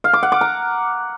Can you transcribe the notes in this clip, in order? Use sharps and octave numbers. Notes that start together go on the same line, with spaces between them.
F5
D6
F#5
D6
A#5